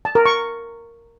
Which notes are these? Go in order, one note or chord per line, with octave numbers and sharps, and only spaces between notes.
A5
A#4
C#6